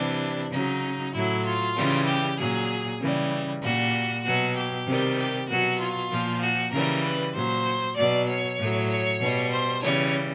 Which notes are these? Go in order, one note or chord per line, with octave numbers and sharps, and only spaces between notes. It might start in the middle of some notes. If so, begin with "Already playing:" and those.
Already playing: C3 E3 G3 D4
C#3 F#3 D#4
A2 F#3 E4
F4
C#3 E3 G3
G4
A#2 F#3 G#4
C#3 E3 G3
A#2 G3 F#4
B2 F#3 F#4
G4
C3 D#3 G3
G4
B2 F#3 F#4
F4
A#2 F3
F#4
C#3 E3 G3 A#4
B4
A#2 F#3 C5
B2 F#3 D5
C#5
A2 F#3
C#5
B2 G3
C5
C#3 E3 G3 C#5